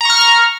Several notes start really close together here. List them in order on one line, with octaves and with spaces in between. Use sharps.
A#5 C#6 F6